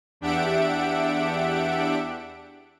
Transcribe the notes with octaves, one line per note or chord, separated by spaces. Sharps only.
E2 D4 G4 E5 F#5 D7